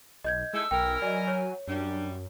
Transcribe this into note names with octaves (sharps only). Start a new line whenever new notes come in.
B1 D#5 G6 G#6
G#3 A3 D#4 E4 E6
B1 E3 A#4 G5
F#3 D5 D#5 G#5
C#5
F#2 G3 D4